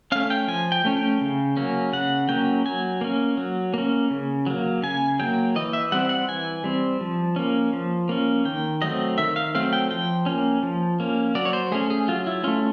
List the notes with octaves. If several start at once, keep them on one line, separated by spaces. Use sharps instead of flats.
A3 C#4 F5
G5
F3 G#5
G5
A3 C#4
G5
C#3
F#3 A#3 C#4
C#3 F#5
F#3 A#3 C#4 G5
F#3 G#5
A#3 C#4
F#3
A#3 C#4
C#3
F#3 A#3
C#3 G#5
F#3 A#3 G5
E3 D#5
E5
G3 C4 F#5
F#5
E3 G#5
G3 C4
F3
A#3 C#4
F3
A#3 C#4
D#3 G5
F#3 A3 C4 D#5
D#3 E5
F5
F#3 A3 C4 F5
G5
F3 G5
A#3 C#4
F3
A#3 C#4
F#3 D5
C#5
C5
A3 C#4 G#4
G#4
F#3 F4
E4
A3 C#4 F4